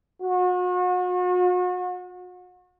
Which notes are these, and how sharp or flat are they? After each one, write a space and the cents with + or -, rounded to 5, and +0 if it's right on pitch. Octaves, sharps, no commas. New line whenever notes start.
F#4 -40